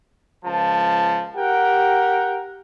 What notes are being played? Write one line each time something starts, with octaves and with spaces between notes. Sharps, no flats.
C#2 F3 A5
G4 A#4 F#5 G5